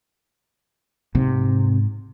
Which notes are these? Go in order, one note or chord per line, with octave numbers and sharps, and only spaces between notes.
G#2 C3